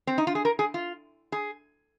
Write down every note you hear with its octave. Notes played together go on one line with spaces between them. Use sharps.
C4
D#4
F4
G#4
A#4
G#4
F4
G#4